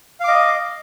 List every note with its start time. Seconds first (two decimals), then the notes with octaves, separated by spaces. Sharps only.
0.20 F5
0.24 D6
0.28 D#5